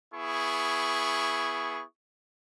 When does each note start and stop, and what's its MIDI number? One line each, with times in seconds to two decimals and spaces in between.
0.14 1.83 59
0.14 1.83 64
0.14 1.83 68
0.14 1.83 85